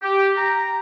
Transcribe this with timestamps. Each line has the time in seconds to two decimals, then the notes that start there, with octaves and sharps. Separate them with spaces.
0.02 G4
0.36 A#5